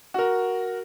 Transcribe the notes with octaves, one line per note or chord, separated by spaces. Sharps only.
F#4 A#4